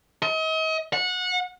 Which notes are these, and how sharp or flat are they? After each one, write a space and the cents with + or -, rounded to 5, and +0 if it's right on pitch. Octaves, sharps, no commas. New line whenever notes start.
D#5 +40
F#5 -25